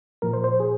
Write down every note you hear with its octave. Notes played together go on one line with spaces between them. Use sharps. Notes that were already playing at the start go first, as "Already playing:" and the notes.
A#2 F3 A#4
C5
C5
G#4